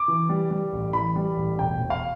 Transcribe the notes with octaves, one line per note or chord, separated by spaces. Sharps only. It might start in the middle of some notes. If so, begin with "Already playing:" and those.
Already playing: D6
E3
G3
G3
A1
E3 B5
G3
A1
E1 G5
E1
F5